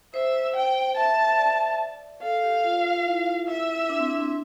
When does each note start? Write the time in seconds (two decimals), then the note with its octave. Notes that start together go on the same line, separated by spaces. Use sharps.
0.14 C5 E5
0.35 C5
0.56 G5
0.97 E5 A5
1.38 D5
2.22 A4 F5
2.43 G4
2.64 F4
3.06 E4
3.48 E5
3.89 D4
3.99 C4
4.10 D4
4.20 C4